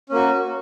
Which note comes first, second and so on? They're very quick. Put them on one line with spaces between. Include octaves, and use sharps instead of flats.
C#4 A#3 F#4